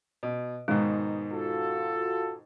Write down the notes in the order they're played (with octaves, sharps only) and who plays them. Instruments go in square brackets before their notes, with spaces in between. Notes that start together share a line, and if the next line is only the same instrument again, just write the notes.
[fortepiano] B2
[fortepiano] G#2 B2 D#3 [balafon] G#3
[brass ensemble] F4 F#4 A4